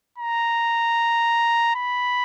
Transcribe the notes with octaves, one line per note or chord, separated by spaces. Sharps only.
A#5
B5